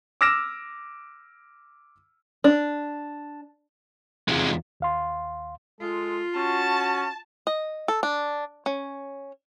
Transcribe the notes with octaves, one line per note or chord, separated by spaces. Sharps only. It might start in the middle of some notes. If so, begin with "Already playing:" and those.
D6 E6 F6 A#6 D7 E7
D4
E2 C3 G#3 D#4 F4
D#2 F5 C6
G#3 F4 A4
C#4 F#4 A5
D#5
A4
D4
C#4